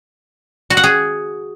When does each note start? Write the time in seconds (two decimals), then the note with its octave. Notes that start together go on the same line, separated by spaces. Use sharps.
0.70 F#4
0.77 F#5
0.83 G#4